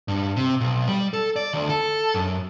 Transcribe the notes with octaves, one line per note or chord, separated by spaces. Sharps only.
G2
C3
B1
G3
A4
D5
D2
A4
F#2